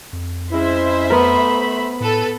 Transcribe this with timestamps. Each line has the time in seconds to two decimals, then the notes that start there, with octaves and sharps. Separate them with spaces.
0.13 F2
0.51 G#3 C#4 E4 C5 E5
1.10 A3 B3 A#4 B5
2.00 A2 A4 B4